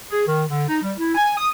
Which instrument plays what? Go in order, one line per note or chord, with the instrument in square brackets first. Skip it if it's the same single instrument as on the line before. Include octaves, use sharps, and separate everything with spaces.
[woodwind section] G#4
D#3
D3
D#4
G3
E4
G#5
D#6